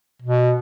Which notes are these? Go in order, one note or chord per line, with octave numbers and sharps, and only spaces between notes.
B2